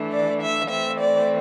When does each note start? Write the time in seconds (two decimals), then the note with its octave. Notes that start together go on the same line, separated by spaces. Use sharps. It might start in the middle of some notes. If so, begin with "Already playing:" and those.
Already playing: E3 A3 D4
0.13 D5
0.42 E5
0.70 E3 A3 C4 E5
1.00 D5